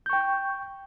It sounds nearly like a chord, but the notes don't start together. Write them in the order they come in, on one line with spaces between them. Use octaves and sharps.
G6 C#6 G5